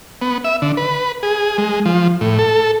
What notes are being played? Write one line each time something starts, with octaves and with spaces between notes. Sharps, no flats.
B3
E5
D3
B4
G#4
G#3
F3
A2
A4